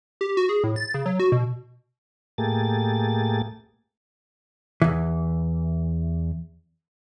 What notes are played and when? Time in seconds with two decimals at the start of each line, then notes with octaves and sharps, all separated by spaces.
0.21 G4
0.37 F#4
0.49 G#4
0.64 A2
0.76 A6
0.94 C#3
1.06 F#3
1.20 F#4
1.32 B2
2.38 A2 A3 A#3 G4 G#4 A6
4.82 E2 E3